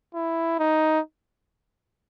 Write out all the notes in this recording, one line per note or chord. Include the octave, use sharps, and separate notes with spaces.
E4
D#4